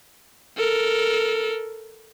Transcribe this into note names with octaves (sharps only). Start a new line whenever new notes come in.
A4 A#4